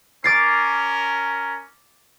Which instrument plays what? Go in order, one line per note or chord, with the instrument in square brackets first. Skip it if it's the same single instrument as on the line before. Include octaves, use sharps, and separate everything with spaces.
[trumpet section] C#4 A#4 [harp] D6 A6 C7